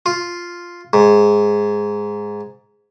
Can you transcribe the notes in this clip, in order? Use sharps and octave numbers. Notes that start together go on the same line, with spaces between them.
F4
G#2